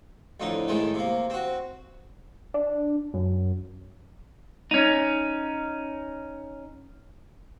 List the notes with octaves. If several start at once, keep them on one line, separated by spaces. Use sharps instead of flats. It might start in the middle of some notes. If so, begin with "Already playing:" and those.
F2 A2 D3 D#4
A2 D#3 G#3 A3
C3 A#3
C4 F#4
D4
F#2
C#4 D#4